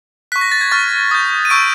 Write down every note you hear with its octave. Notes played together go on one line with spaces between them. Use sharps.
C#6 F#6 B6
A#6
A6
G#6
C#6 F6 A6
D#6 G6
D#7
C#6 E6 G6 D7